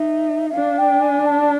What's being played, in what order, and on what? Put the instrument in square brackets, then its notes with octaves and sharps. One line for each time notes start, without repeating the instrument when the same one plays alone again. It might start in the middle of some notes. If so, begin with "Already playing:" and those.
Already playing: [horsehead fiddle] D#4 [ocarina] E5
[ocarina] E5
[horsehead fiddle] D4 [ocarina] F5
[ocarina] G5
G#5
A5